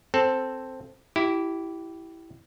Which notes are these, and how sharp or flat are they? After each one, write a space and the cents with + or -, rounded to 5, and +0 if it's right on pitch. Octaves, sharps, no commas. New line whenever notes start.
C4 +0 A4 +0
E4 +0 G4 -20